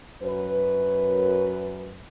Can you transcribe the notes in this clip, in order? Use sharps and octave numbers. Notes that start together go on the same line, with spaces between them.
F#2 B4